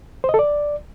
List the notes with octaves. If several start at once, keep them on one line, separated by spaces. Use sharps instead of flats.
C5
D#5
A4
D5